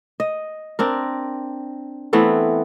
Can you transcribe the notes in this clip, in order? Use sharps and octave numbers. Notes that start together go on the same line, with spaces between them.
D#5
C4 D4 A#4
E3 A3 B3 C4